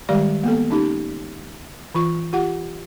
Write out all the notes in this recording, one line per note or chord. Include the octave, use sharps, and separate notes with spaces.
D#3 G3 G#3 G4 D5 F5
A#3 B3 A4
C#4 D#4 G4
E3 F4 C#6
F4 G4 F#5